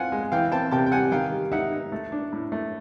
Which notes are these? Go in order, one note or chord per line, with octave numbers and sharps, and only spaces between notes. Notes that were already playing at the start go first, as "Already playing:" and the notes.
Already playing: C4 F4 F#5 G#5
G#3
E3 F5 G5
C4 G5 A5
C3 G5 A5
G5
G3 F#5 G#5
D#3 F5 G5
G3
D#4 E5 F#5
D#4
A3
D4
A2
A3